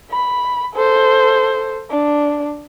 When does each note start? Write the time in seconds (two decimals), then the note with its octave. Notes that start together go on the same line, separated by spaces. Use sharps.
0.11 B5
0.74 A4 C5
1.91 D4